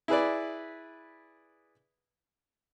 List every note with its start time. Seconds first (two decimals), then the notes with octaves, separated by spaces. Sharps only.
0.08 E4 G#4 B4 D5